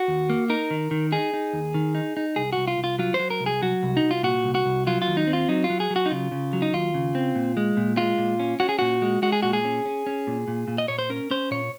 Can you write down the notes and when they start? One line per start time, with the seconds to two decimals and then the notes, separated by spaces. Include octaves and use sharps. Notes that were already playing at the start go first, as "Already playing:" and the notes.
Already playing: F#4
0.08 D#2
0.30 A#3
0.50 D#4 A#4
0.71 D#3
0.91 D#3
1.12 D#4 G#4
1.33 D#4
1.53 D#2
1.74 D#3
1.95 D#4
2.17 D#4
2.36 C2 G#4
2.53 C2 F#4
2.68 F4
2.78 C2
2.84 F4
2.99 F#3 F4
3.14 C5
3.19 F#3
3.30 A#4
3.40 C2
3.46 G#4
3.62 F#3 F#4
3.83 C2
3.97 D#4
4.03 C2
4.11 F4
4.23 A#2 F#4
4.44 C2
4.55 F#4
4.65 C2
4.87 F#3 F4
5.02 F4
5.07 D#2
5.17 D#4
5.27 C4
5.33 F4
5.49 F#3 D#4
5.64 F4
5.70 F#3
5.80 G#4
5.90 F#3
5.96 F#4
6.06 D#4
6.10 C#3 F4
6.32 C#3
6.53 F#3
6.62 D#4
6.73 D#2 F4
6.94 C#3
7.15 C4
7.35 A#2
7.57 G#3
7.77 A#2
7.97 G#3 F4
8.18 A#2
8.40 C#4
8.60 C#4 F#4
8.69 G#4
8.79 A#2 F#4
9.02 G#3
9.22 G#3 F#4
9.32 G#4
9.43 A#2 F#4
9.53 G#4
9.65 C#4
9.86 C#4
10.06 C#4
10.27 A#2
10.48 A#2
10.68 A#2
10.78 D#5
10.88 A#2 C#5
10.99 C5
11.10 C#4 A#4
11.30 C#4 C5
11.51 A#2 C#5